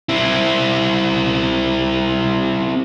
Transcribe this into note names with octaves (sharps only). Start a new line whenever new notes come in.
C4 E4